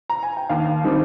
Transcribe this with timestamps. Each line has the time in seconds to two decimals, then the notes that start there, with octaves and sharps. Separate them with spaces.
0.10 A#5
0.23 G#5
0.37 G5
0.49 D#2 F5
0.84 D#3 G3 C4 D#4